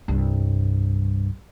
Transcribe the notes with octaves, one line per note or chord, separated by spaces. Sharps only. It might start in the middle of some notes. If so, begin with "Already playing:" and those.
C2 G2